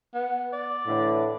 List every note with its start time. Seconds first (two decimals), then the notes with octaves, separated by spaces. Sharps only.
0.14 B3
0.53 D5
0.86 A2 D3 E3